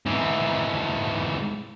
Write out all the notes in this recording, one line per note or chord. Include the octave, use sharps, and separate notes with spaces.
G#2 E3